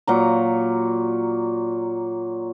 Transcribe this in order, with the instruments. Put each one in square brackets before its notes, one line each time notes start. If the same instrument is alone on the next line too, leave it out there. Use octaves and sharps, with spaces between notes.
[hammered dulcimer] A#2 F#3 A#5